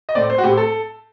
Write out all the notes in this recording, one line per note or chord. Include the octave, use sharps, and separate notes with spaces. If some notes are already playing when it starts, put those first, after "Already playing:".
D#5
A2 A3 C4 D5
C5
F#4
A2 A3 C4 G4
A4